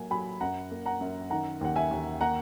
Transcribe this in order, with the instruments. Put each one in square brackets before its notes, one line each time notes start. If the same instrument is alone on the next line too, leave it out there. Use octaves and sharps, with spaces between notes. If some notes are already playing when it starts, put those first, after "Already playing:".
Already playing: [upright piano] F#3 A#3 G#5
F#3 G#5 B5
F#2 F#5 A#5
A#3
F#5 A#5
F#2
D#3 F#5 A#5
D#2 F#5
E5 G#5
D#2
A#3 F#5 A#5